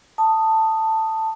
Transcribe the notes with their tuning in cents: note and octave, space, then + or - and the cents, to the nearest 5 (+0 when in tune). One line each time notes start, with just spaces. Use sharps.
A5 +10 D#6 +0